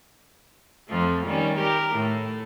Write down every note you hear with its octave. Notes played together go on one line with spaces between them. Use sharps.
F2 F3 A3
D#3 G3 C#4
G4 A#4
A2 A3